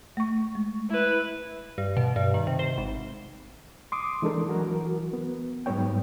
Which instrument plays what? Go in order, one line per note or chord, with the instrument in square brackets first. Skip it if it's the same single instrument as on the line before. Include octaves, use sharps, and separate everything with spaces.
[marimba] A3 C#6
G#3
[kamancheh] E4 B4
[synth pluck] G2
B2
G2
D#3
C3
C5
G#1
[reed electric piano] C6 D6 D#6
E3 G#3 D4 A4 A#4
E3 F#3 F#4 A#4
B3
G#2 F#3 G3 B3 C#5 G5